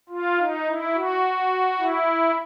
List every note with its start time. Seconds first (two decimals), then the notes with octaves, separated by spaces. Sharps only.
0.09 F4
0.39 D#4
0.67 E4
0.95 F#4
1.79 E4